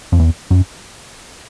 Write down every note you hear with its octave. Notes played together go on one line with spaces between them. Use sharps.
F2
E2
F#2